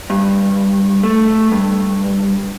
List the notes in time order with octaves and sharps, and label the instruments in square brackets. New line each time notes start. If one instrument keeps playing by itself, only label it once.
[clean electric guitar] G2
A3
G2